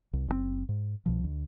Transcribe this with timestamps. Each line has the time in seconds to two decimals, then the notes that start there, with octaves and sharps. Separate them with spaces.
0.13 C2
0.28 F#1 C3 C4
0.69 G#2
1.06 C2 B2 F3
1.24 D2